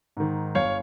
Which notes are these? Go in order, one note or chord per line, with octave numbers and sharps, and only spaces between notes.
G#2 D#3
G1 C#5 F5